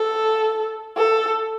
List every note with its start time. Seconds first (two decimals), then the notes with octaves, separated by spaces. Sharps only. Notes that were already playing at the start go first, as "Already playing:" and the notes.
Already playing: A4
0.97 A4